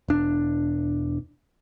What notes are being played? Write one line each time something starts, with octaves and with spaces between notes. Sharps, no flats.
E1 D4